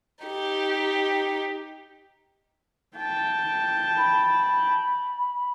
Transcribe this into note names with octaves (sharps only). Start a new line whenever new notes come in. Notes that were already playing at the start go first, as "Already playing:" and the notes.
D#4 G4
G5 A5
B5